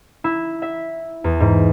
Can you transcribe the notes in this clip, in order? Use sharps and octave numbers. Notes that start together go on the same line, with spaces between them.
E4
E5
E2
G#2